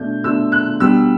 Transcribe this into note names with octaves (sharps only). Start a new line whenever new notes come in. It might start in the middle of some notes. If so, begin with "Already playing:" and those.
Already playing: B2 A3 D4 G6
B2 A3 D4 E6
F#6
B2 G3 B3 D4 E6